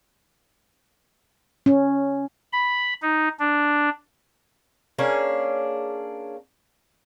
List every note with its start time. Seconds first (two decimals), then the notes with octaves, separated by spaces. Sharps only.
1.66 C#4
2.53 B5
3.02 D#4
3.40 D4
4.99 A#3 C#4 D4 G#4